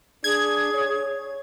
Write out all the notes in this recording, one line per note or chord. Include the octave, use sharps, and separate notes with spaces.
D4 G#4 G#6
C#5